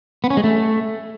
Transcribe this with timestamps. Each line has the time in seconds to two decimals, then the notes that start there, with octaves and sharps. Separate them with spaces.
0.24 B3
0.30 C#4
0.37 G#3
0.44 A3